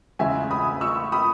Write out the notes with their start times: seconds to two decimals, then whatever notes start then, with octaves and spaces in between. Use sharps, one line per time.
0.19 E2 C#3 G#3 E5 G#5
0.51 B5 D#6
0.81 C#6 E6
1.12 B5 D#6